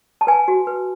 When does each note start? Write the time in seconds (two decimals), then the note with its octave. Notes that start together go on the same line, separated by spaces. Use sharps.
0.21 A5
0.27 B4 G#5
0.48 F#4
0.67 B4